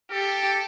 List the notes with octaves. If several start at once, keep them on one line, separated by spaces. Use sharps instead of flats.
G4 A4